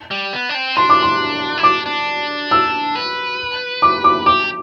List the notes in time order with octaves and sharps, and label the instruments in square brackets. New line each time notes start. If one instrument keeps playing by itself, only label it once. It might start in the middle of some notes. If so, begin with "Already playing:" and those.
[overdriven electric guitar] G3
B3
D4
C4
[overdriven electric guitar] D4 [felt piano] C6
[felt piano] D6
C6
[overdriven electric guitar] E4
[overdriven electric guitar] D4 [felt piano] D6
[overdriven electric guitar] D4
[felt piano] E6
[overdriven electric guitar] B4
[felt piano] D6
D6
[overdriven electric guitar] G4 [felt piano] D6